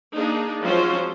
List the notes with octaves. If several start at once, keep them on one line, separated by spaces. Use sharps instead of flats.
A#3 D4 D#4 G#4
F3 F#3 G#3 C4 C#4 C5